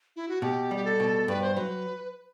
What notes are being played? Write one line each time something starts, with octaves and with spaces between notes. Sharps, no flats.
E4
F#4
B2 G4
G3
G4
A4
B2
G2 B4
C5
F#3 B4